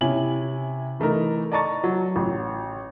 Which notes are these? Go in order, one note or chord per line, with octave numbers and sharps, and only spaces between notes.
C3 C#4 E4 G#5 F#7
E3 A3 D#4 A#4
D5 D#5 A5 A#5 C#6 A6
F#3
A1